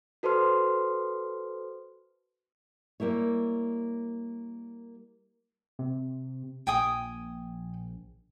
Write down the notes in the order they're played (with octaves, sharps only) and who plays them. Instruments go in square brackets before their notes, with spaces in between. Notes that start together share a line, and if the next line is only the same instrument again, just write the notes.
[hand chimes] F#4 A4 B4 C5 C6 F6
[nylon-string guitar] G3 A#3 E4 C#5
[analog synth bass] C3
[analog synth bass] A#1 [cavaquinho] G5 G#5 D#6